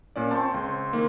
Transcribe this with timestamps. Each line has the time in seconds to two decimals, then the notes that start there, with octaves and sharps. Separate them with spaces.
0.16 A#2 C#4 D5
0.31 C4 G5 A5 C6 C#6
0.54 C#2 C5
0.93 D#3 A#3